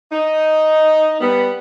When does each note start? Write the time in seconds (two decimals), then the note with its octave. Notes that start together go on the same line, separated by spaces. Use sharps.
0.12 D#4
1.21 G3 B3